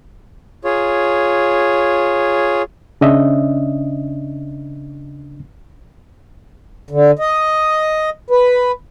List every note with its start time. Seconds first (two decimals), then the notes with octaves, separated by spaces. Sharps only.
0.64 F4 G#4 C#5
3.01 C#3 C#4 D4 D#5 E5
6.90 D3
7.19 D#5
8.30 B4